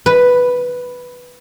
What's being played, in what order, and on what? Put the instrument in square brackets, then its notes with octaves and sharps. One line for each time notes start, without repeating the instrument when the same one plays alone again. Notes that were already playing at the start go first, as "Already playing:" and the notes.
[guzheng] B4